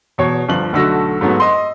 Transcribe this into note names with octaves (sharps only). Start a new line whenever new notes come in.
E2 B2 C#5
G1 F3 F#7
B1 D3 A3 F#4 E6 A#6
G#2 F#3 A3 B3
D#5 C6